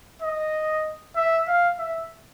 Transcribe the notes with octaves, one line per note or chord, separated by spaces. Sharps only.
D#5
E5
F5
E5